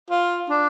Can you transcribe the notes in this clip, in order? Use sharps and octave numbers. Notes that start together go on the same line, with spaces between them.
F4
D4